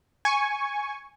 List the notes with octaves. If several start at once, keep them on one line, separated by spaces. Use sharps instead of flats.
G#5 C#6